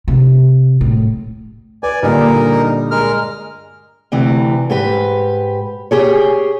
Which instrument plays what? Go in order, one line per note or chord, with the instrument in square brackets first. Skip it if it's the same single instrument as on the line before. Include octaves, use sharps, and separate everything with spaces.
[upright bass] C3
A2
[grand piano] B4 [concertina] D5 G#5
[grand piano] G2 A#2 D3 [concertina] D#4 A#4
[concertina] G#3 A#4 F6
[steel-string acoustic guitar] D2 C3 E3
G#2 G4 B4
G4 G#4 C#5